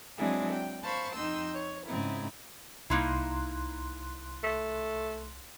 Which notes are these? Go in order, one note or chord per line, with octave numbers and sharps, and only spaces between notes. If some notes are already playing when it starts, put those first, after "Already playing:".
F#3 G#3 C4 D4 E4 G#4
G5
C5 F5 A5 B5 C#6
F2 D#4 G5 C6 E6
C#5
G#2 C#3 C4 D#4 E4
C2 A#3 D#4 E4 C6 F#6
A3